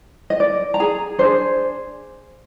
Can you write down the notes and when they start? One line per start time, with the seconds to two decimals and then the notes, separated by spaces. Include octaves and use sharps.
0.30 D#5
0.40 D5
0.74 A#5
0.80 G#4 G#5
1.18 D4 G#4 C5